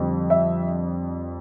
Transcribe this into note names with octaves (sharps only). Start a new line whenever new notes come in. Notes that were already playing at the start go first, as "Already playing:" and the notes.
Already playing: F2 D3 G3
E5